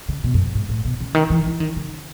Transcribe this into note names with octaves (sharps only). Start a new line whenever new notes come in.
C#3
B2
F#2
G#2
A2
B2
C#3
D#3
E3
E3
D#3
C#3